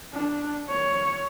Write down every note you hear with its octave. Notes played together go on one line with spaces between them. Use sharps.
D4
C#5